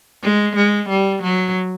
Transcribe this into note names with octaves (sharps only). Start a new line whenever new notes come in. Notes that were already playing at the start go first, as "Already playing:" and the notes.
G#3
G#3
G3
F#3